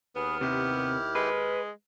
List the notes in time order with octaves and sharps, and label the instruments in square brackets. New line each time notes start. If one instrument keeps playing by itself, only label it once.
[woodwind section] D#2 F6 [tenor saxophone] B3 [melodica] G#4 B4
[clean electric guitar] C3 [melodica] E4 G4
[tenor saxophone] G#3 [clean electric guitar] B4